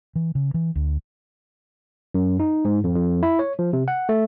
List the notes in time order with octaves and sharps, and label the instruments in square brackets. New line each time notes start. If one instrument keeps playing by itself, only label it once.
[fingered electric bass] E3
C#3
E3
D2
[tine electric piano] F#2
D#4
G#2
F2
F2
E4
C#5
F3
C3
F#5
A3